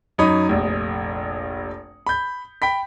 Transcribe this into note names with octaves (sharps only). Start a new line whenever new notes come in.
F#2 D#4 C#5 B5 D#6
F1 A#1
B5 G6
G5 B5 B6